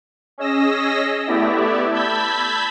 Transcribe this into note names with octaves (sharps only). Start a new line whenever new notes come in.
C#4 G#4 D#5 E6 A#6
A3 B3 E4 G4 D5 E5
A5 B5 E6 G6 G#6 B6